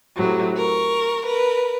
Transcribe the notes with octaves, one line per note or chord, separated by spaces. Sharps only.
A2 C3 F#3
A#4 C#6
A#4 B4